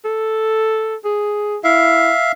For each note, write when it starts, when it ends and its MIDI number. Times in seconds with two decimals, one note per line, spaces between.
0.05 0.95 69
1.04 1.58 68
1.64 2.12 64
1.64 2.32 76
1.64 2.32 77